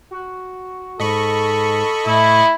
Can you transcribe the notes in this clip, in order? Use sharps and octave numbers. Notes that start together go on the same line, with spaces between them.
F#4
G#2 A4 D#5 B5 C#6
A2 E4